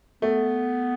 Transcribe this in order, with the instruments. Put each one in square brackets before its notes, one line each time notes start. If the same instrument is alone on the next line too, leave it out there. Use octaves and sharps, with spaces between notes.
[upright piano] A3 [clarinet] B3